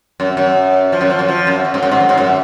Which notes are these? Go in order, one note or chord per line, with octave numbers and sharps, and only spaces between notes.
F#2
F#2
F3
F#2
F3
F#2
F3
F#2
F#2
G#2
F#2
G#2
F#2
G#2
F#2